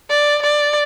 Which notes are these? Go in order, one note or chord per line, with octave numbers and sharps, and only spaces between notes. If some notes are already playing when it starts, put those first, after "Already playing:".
D5
D5